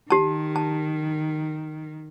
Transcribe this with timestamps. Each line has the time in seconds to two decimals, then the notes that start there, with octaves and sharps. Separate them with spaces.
0.10 D#3 G4 A5
0.56 A5